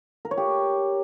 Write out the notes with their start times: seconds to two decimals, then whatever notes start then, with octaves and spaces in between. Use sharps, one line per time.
0.25 A#4
0.31 C#5
0.37 G4